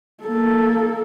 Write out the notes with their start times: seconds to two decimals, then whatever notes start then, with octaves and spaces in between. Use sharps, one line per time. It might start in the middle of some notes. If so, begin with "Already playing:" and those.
0.24 A#3 A4